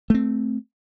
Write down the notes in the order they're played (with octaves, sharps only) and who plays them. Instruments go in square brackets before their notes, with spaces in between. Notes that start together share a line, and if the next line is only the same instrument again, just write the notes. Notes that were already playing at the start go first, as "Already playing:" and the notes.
[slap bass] A3 C4